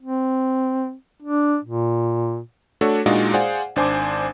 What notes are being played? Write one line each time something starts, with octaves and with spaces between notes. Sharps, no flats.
C4
D4
A#2
A3 D4 F#4 A4 C#5
A#2 G#3 D4 D#4 F4 F#4
G#4 C5 D5 F5 F#5 G#5
G#1 D4 C5 G#5 A5 D6